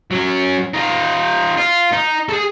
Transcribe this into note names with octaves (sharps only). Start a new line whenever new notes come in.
F#3 C#4
D#4 F4
F4
D#4
G#4 A4